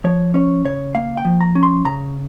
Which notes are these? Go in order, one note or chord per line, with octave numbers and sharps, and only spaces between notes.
F3 C#5
C#4 C#5
C#3 C#5
A#3 F5
G5
F3
A#5
C#4
C6
C#3 A#5